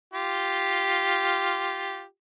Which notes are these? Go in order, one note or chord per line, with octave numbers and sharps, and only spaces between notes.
F4 G4